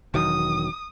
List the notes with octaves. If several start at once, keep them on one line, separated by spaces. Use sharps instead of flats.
E1 D#3 F#3 D#6